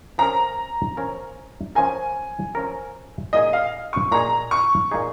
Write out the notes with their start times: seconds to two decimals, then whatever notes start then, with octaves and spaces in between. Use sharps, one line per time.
0.18 F3 C#4 A#4 A#5
0.97 F3 C#4 A#4
1.75 F3 C#4 A#4 G#5
2.55 F3 C#4 A#4
3.33 A#2 A#3 D#4 G#4 D#5
3.53 F5
3.93 C#6
4.12 A#2 A#3 D#4 G#4 A#5
4.51 C#6
4.91 A#2 A#3 D#4 G#4